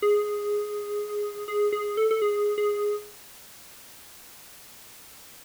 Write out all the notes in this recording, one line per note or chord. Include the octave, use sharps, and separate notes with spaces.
G#4
G#4
G#4
A4
A4
G#4
G#4